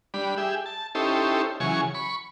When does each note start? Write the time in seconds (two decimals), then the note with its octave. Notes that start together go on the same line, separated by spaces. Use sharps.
0.14 G3 D4 B5
0.37 G4 G#4 E5
0.66 A5
0.95 C#4 D#4 E4 G4 A4 C5
1.60 C#3 E3 F#3 G#4 G#5 C#6
1.94 B5 C#6